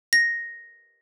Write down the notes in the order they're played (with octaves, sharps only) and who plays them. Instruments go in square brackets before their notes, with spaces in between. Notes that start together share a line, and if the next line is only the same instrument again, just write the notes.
[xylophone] A#6